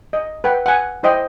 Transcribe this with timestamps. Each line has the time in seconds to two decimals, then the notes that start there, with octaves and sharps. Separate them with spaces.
0.13 D#5
0.44 B4 F#5 G5
0.66 F#5 G#5
1.03 E4 C5 D#5 G5